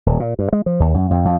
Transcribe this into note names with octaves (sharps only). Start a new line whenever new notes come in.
D#1
A#2
G2
G#3
F3
D#2
F#2
F2
F2